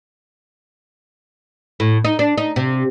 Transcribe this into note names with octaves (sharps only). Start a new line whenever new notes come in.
A2
D#4
D4
D#4
C3